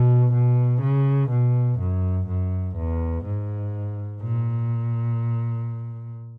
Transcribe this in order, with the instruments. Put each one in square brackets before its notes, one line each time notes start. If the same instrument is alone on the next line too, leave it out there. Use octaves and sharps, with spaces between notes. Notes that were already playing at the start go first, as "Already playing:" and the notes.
Already playing: [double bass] B2
B2
C#3
B2
F#2
F#2
E2
G#2
A#2